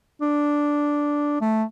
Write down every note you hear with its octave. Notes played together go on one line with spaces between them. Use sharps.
D4
A3